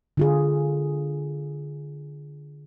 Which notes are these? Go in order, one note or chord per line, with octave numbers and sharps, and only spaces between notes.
D3 F4 G#4